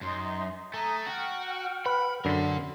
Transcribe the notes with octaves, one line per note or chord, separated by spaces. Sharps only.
F#2 D#4 C6
A3 G#5 A#5 D#6
F#4 F#5 G5 F6
B4 B5
F#2 D3 A#4 C6